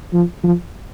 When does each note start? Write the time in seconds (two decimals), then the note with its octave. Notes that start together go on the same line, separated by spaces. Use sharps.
0.13 F3
0.44 F3